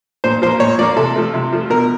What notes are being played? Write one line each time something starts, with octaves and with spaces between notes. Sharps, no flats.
A#2 C5
F3 A#3 C5
A#2 C#5
F3 A#3 D5
C3 A4
F3 A3
C3
F3 A3
B2 A#4